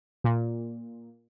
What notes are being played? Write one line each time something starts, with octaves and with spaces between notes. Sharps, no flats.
A#2